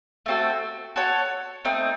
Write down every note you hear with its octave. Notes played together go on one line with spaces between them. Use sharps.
A3 C4 F#4 A4
F#4 A4 C#5
A3 C4 D#4